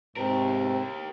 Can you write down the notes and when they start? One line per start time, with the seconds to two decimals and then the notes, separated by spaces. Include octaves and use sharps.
0.16 G#2 C3 G4 A#4